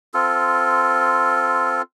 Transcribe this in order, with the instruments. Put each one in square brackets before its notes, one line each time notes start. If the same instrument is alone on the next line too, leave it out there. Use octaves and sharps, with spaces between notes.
[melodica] C4 F4 A4